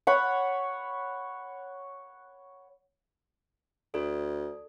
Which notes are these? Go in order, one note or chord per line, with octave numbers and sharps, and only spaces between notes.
C#5 F#5 B5
D2 A4 D5